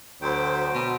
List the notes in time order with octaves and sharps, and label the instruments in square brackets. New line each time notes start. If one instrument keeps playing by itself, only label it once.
[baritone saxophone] D2 [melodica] F#3 C5 G5
[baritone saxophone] B2